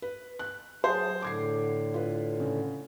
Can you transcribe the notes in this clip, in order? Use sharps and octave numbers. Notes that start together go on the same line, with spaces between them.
B4
F#6
F#3 G#4 C5 A5 C7
A2 D3 D6 G#6 C7
F4 B4
C#3